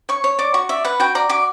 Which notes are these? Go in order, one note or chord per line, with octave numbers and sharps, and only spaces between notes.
C#5 C#6
C#5
D5 D6
F#4 C#6
D5 E5
B4 F#5
F#4 G5
D5 A#5
F#4 D6